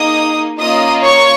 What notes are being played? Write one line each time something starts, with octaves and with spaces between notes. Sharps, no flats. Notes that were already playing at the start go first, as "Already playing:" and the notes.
Already playing: A#3 D#4 G#4 D#5 D#6
A#3 C#4 F4 D#5 D#6
C#5 C#6